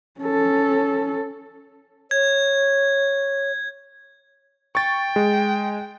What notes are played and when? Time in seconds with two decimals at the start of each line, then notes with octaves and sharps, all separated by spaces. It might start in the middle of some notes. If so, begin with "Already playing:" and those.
0.21 C#4 A4
2.11 C#5 G#6
4.75 G5 C#6 A6
5.16 G#3